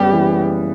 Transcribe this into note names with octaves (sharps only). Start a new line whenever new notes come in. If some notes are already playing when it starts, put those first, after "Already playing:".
Already playing: F#1 G3 B3 G4
E3